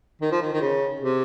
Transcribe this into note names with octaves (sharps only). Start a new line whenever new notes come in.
D#3
F3
D#3
D#3
C#3
C3